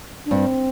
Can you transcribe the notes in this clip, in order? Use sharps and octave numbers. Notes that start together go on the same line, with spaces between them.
D4
G2 C4